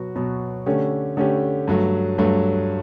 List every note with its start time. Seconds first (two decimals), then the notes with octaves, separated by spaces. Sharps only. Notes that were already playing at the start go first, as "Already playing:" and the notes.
Already playing: B2 F#3 B3 F#4
0.16 B2 F#3 B3 F#4
0.66 D3 A3 C#4 G4
1.17 D3 A3 C#4 G4
1.68 G2 F#3 A3
2.18 G2 F#3 A3